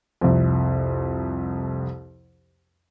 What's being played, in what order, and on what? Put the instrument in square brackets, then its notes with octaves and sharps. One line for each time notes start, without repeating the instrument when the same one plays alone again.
[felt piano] C2 F2